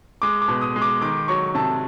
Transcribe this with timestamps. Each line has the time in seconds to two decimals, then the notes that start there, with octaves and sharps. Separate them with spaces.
0.22 G#3 D6
0.42 D6
0.48 B2
0.61 D#6
0.76 G#3
0.82 D6
1.01 D#3 D6
1.28 F#3 C#6
1.55 C3 A5